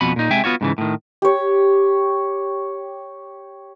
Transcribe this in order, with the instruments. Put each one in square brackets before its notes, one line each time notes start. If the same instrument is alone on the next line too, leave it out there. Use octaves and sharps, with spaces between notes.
[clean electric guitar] F2 B2 B3 B5
A#2 D#4
C3 G#3 E5 G5 G#5
B3 F4 F#4 C#5
G#2 C#3 E3
A2 D#3
[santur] G4 C#5